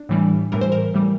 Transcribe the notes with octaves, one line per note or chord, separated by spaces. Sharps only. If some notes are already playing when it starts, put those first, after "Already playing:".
Already playing: D4
A2 E3 G3
A2 E3 G3 A#4
C5
A#4
A2 E3 G3